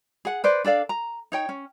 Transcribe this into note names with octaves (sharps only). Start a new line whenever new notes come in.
G#4 F#5
B4 C5 D5
D4 A4 D5 F5
A#5
D#4 C#5 G5
C#4